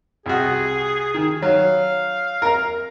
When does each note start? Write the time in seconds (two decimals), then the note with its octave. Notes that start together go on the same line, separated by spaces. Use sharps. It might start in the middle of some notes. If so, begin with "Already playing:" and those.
0.26 C2 F#4 G#4
1.14 D#3
1.42 F#3 F5
2.42 A#4 A#5